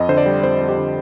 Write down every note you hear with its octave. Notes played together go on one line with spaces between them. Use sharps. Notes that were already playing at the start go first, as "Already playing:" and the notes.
Already playing: F2 D#5
D3 C5
D5
G3
F2 C5
F2
G4
D3